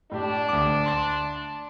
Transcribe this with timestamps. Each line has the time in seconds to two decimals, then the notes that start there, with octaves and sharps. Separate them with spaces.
0.11 A2 D4 G4
0.49 D2 D6
0.86 C6 A6